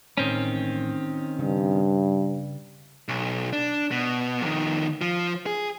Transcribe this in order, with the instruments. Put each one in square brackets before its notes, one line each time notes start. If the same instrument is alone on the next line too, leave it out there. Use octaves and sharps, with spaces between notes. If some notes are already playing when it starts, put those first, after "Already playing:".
[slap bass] A1 A2 G#3 [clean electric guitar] D#3 C4 C#4
[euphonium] G2 [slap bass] C#3
[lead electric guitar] B1
D4
B2
F2 D#3
F3
G#4